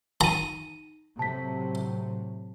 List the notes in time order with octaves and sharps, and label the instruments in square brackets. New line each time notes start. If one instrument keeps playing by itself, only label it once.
[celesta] D#4 D#7 [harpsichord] A#5
[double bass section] A2 C3 F#3 [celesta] A5 B6